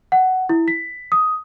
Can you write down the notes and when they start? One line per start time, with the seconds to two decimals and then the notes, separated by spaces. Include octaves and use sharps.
0.12 F#5
0.49 E4
0.68 B6
1.12 D#6